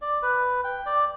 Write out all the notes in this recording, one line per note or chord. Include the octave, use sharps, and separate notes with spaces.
D5
B4
G5
D5